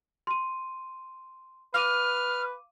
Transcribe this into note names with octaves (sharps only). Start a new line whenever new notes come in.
C6 D#7
B4 F5 D6 F6 D#7